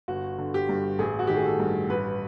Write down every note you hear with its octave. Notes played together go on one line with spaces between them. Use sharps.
G1 F#4
D3
G4
G2
A1 G#4
F#4
D#3 G4
G#4
A4
G2
A1 B4